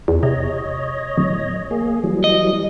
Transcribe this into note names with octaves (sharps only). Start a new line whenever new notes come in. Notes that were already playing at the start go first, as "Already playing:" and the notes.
E2
C3 C#5 D#5
D1
A#3 G#4
E3 F#3 G3
D#5